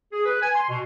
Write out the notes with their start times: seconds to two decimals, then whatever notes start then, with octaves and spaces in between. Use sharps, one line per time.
0.13 G#4
0.26 B4
0.42 G#5
0.55 C6
0.69 B2